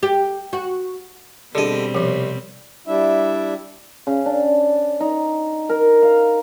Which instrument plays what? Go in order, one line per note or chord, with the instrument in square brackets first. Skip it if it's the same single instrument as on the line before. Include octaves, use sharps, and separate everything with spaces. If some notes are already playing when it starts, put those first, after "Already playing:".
[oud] G4
F#4
[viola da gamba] B2 G3 C4 [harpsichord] D3 D#5 [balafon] D4 G4 G#4
[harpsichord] C2 [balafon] F3 D6
[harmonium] G3 D4 E4 E5
[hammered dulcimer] C#3
D4
D#4
A#4
F5